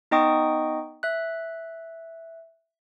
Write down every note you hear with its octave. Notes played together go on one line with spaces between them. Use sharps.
B3 D#4 D#5 G5 C#6 D#6
E5 F#6